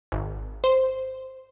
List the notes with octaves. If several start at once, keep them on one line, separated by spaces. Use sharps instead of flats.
G#1
C5